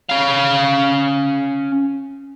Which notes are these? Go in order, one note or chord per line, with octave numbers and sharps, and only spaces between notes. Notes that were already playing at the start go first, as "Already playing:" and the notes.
C#4 F5